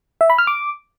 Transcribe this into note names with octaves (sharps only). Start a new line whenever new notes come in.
E5
B5
F6
D6